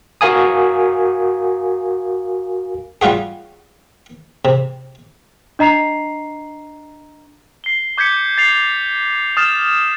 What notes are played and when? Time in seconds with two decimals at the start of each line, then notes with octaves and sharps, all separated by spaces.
0.21 F#4 A#4 F5 G#5 D#6
3.02 G3 G#3 F4 F#4 G#4
4.45 C3
5.59 D4 D#5 A#5 C7 F7
7.64 C7 G7
7.98 D6 G6 G#6 B6 C#7
8.38 A6 C7 F7
9.37 D#6 F6 A6 E7